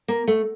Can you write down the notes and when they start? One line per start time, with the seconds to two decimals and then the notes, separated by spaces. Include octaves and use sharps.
0.08 A#3
0.28 A3